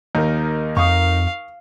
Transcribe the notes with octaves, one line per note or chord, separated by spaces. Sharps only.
D#2 D#4 A#4
F2 F5 C#6 D#6